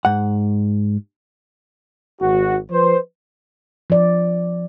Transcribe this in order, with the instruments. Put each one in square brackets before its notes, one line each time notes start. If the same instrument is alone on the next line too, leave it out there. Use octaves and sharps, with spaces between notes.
[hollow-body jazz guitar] G#2 F#5
[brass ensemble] G#1 F#4
F3 B4 C5
[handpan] F3 D5